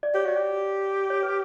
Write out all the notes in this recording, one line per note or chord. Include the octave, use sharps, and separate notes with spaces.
D5
G4 C#5
F#4 D5
G4
C#5
B4